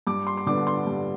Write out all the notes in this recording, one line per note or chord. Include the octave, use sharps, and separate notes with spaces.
G2 D6
C6
C6
D3 G3 B3 D4 D6
C6
G2